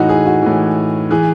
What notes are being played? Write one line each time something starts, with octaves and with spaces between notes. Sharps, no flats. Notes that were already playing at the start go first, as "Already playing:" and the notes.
Already playing: A2 E3 D#4 F#4
G#4
F#4
A2 E3
E3 G#4